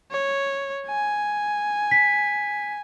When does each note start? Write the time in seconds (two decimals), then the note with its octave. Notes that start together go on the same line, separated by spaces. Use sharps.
0.11 C#5
0.87 G#5
1.91 B6